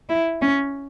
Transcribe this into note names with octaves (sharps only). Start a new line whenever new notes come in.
E4
C#4